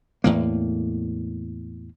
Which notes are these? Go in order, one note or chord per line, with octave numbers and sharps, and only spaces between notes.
E2 A2 A#3